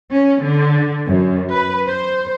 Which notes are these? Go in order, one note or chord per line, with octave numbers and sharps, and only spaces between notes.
C#4
D3
F#2
B4
C5